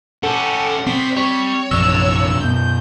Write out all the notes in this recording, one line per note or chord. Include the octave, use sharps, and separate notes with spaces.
C#4 G4 A4 F#5
C4 C5 D5 B6
G3 G4 C#5
A#1 F#2 C3 D4 E6
F#2 B2 G6